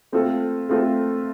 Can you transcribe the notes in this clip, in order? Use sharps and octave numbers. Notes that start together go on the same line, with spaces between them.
A3 C4 F4 A4
A3 C4 F4 A4